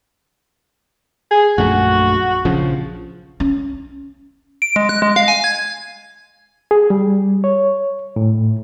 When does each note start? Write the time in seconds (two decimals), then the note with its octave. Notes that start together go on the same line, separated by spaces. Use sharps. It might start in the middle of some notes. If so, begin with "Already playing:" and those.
1.31 G#4
1.58 A#1 F#2 A3 F#4
2.45 A#1 C#3 F3
3.40 C#4
4.62 D7
4.76 G#3
4.89 F#6
5.02 G#3
5.16 F5
5.28 G#5
5.44 G#6
6.71 G#4
6.90 G3
7.44 C#5
8.16 A2